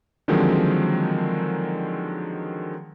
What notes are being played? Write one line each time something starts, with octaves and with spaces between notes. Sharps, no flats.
D3 D#3 F3 F#3 G#3 C4